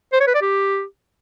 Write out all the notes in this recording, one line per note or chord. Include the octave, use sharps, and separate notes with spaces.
C5
C#5
B4
D5
G4